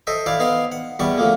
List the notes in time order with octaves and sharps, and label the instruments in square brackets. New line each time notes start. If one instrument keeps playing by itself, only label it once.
[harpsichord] A4 C5 D#5 E5 G5
E4 C5 D5 F5 G5
B3 D#4 C5 F5 G5 C6
F#5
E2 G3 B3 D5 G5 C#6
D3 F3 A3 A#3